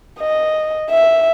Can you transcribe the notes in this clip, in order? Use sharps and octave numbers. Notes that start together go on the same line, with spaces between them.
D#5
E5